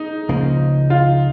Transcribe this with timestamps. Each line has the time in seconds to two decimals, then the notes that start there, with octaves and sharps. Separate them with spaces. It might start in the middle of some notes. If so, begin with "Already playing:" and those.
Already playing: D#4
0.29 C#2 C#3 F3 A#3
0.90 F4